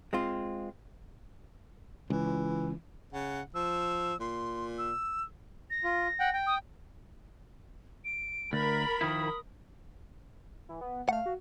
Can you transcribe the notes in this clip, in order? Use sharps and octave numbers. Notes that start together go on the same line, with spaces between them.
G#3 C4 F4
C#2 E3
C#3 F#5
F3 E6
A#2 C6
E6
A#6
F4
F#5 G5
G5
D#6
D7
D2 A#4 B5 A6
D#3 F3 E4 D#6
E3
B3
A3 F5 F#5
F#4